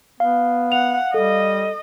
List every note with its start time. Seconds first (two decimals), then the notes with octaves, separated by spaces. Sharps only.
0.20 B3 F5
0.72 F#5 F7
1.14 G3 A4 D#5